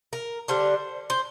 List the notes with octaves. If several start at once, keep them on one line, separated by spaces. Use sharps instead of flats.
A#4
D3 G3 D4 C5
C5